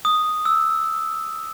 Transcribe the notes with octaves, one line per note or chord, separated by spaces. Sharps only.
D#6
E6